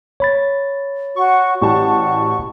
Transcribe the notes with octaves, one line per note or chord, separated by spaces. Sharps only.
C#5 B5 A6
F#4 C#6
A1 G3 F#4 A5 C#6